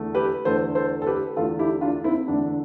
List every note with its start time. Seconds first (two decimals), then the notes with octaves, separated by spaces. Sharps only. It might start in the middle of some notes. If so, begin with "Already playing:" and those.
Already playing: E2 D3 A3
0.15 G4 B4
0.45 E2 D3 A3 A4 C5
0.75 A4 C5
1.02 A4
1.07 G4 B4
1.36 E2 D3 A3 F4 A4
1.59 E4 G4
1.81 D4 F4
2.04 C4 E4
2.28 E2 D3 A3 D4